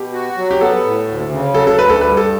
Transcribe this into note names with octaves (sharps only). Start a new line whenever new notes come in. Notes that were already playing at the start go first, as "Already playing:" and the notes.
Already playing: B2 G4
F#4
F#3
G4
B3 A4
A2
D2
C#3
F#3 A4
A4
D2 B4
A4
G2 B4
A4